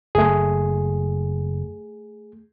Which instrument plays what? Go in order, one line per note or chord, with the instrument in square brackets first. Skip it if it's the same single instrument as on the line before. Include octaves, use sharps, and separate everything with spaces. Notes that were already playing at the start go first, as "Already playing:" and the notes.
[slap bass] F#1 [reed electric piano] A3 G#4